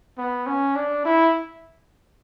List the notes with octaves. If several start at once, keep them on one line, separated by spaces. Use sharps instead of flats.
B3
C#4
D4
E4